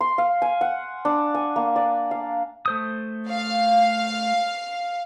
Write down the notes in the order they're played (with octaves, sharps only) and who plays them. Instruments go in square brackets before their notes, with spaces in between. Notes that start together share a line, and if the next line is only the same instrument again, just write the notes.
[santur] C6
F5
G#5
F#5
D4
G#5
A#3
D5
F5
[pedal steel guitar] A3 C5 D#6
[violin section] F5